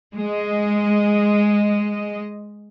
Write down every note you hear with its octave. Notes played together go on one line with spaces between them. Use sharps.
G#3 D#5